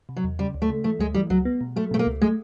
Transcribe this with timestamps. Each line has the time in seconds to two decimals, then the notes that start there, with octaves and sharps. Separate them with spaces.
0.09 C3
0.17 F#3
0.24 E2
0.39 C#3 G3
0.54 D2
0.62 A3
0.70 C#3
0.84 E3 A3
0.99 D2 G#3
1.14 E3 G3
1.30 C#2 F#3
1.45 B3
1.61 B2
1.76 F#3 A3
1.91 B2 A3
1.99 A#3
2.06 C#2
2.22 G#3 A3